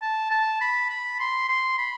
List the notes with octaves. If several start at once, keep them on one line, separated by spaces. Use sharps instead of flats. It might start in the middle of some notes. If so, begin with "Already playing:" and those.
A5
A5
B5
B5
C6
C6
B5